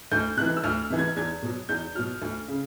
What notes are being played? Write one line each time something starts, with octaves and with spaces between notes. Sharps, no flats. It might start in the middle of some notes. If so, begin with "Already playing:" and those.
D2 G6
C3 E3 F#6
E6
D2 F6
C3 E3
G#6
E2 G#6
B2 F#3
E2 G6
B2 F#3 F6
D2
C#3